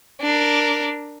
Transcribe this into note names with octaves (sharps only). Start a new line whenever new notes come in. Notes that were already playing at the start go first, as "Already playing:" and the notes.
D4 A#4